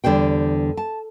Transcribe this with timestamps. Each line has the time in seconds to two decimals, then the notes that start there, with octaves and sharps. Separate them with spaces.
0.04 E2 D3 G3 C5 G5
0.77 A5